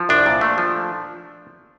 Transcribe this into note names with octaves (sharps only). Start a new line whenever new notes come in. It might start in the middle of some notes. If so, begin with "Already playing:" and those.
Already playing: F3
C2 D4
A#2
A3
F3